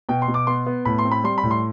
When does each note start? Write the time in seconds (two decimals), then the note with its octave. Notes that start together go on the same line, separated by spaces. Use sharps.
0.09 B2 G5
0.22 C6
0.28 B2
0.34 D6
0.47 B3 C6
0.66 B3
0.85 A2 B5
0.99 C6
1.05 C4
1.11 B5
1.24 G3 C6
1.38 B5
1.43 A2
1.51 C6